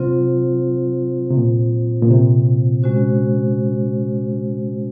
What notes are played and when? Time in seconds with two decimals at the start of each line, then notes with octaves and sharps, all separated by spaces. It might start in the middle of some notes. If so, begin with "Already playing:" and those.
Already playing: C3 F#3 C4 F4 C5
1.30 C3
1.37 A#2
2.02 A#2
2.10 C3
2.83 G#3 C#4 F#4 C5